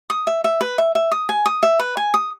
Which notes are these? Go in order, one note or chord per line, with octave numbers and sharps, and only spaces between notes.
D#6
E5
E5
B4
E5
E5
D#6
G#5
D#6
E5
B4
G#5
D#6